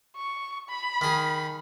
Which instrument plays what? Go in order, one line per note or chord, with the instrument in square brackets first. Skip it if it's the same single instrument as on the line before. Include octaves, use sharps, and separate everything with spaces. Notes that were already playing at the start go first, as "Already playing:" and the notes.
[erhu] C#6
B5
[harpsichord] D#3 G#4